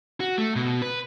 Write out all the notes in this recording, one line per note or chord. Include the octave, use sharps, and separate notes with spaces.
F#4
A3
B2
B4